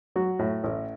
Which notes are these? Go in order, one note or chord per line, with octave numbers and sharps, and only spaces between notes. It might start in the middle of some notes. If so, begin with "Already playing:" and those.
F#3 F#4
A2
A1